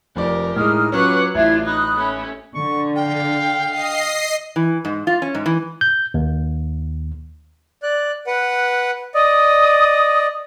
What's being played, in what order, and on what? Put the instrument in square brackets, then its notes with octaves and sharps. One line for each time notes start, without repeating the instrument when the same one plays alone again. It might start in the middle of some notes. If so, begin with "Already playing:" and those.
[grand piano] F1 F2 D5 [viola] G4 A#4
[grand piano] A2 G#3 [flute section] D#4 D#6 F6
[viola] F#3 F#5 [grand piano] C#4 F4 [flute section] B4 C#6 D6
[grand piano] A1 [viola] D4 F4 [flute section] E4 E5 G#6
[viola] D#4 [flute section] B5 D#6 F#6
[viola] A3 C#4
[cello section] D3 [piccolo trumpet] C#6
[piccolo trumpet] F5 [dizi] G5
[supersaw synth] D#5 C7
[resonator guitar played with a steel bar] E3
G#2
F4
C#4
G#2
E3
[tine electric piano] G6
D#2
[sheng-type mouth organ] D5 F#6
B4 F#5
[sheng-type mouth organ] D5 D#5 [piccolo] D#6